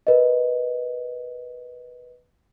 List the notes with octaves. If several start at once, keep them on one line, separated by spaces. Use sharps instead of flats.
A#4 B4 D#5